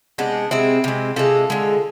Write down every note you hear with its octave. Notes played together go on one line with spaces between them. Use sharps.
C3 G#3 B3 D4
C3 G#3 C4 E4
C3 G#3
C3 G#3 F4 A4
D3 G#3